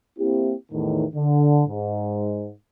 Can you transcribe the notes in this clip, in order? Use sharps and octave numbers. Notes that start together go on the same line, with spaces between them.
A#3 C4 E4 G4
E2 A2 D#3
D3
G#2